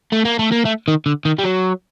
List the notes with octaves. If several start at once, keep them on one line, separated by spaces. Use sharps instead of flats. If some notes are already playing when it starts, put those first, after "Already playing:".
A3
A#3
A3
A#3
A3
D#3
D3
D#3
G3
F#3